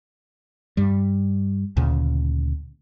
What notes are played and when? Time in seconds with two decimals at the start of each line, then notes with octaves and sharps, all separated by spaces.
0.77 G2 G3
1.77 D2 A#2 C#3